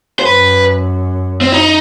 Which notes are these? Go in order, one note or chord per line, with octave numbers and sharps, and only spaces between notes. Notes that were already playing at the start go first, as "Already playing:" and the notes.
C5
F#2 B4
C4
D#4